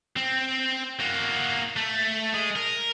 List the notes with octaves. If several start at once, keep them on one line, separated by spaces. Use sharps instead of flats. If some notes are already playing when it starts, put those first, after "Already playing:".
C4
A#3 F#4
A3
G#3 G#4
A#4